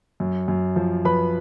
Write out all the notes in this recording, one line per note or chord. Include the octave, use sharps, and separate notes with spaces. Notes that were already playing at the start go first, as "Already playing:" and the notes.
F#2
F#2
F3
F3 B4 B5